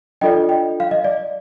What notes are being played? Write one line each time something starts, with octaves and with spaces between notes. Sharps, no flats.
D4 F4 A4 D5 D#5 G5
D#5 G5
F5
D#5
D5